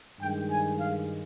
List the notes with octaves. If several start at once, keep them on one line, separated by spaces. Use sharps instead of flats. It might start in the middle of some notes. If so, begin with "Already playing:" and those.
G2 D#3 G#3 G5
G#5
F5